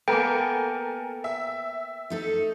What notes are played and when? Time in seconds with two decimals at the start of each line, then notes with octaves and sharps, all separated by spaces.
0.08 A#3 B3 A4 A#4 G5 G#5
1.24 E5
2.10 A3 D#4 A4